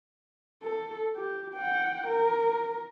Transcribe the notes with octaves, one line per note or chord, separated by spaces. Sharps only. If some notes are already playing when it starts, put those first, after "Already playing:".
A4
G4
F#5 G5
A#4